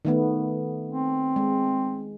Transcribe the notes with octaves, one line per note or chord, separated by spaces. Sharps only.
D#3 A3 B3
C4
G#3